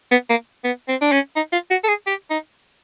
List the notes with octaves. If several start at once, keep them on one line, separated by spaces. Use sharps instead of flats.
B3
A#3
B3
C4
D4
C#4
D#4
F4
F#4
A4
G#4
G4
D#4